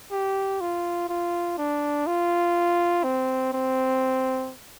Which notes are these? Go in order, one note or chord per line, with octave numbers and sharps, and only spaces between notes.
G4
F4
F4
D4
F4
C4
C4